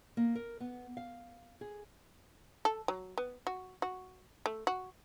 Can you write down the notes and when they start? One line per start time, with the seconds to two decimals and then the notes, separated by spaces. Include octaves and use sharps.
0.17 A#3
0.35 A#4
0.60 B3
0.97 F5
1.61 G#4
2.65 A4
2.88 F#3
3.18 B3
3.47 F#4
3.82 F#4
4.46 A3
4.67 F#4